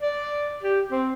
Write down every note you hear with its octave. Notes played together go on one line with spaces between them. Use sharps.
D5
G4
C4